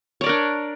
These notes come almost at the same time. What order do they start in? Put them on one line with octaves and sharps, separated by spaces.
C#5 D5 A#4 D4